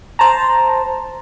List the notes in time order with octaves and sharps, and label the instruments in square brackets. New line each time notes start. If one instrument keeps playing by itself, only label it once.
[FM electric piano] C5 A5 A#5